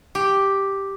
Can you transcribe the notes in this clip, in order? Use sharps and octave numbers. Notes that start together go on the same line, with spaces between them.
G4